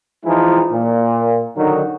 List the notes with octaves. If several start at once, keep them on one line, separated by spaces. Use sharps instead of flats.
E3 F3 G#3 D#4 E4
A#2
D3 D#3 F#3 D#4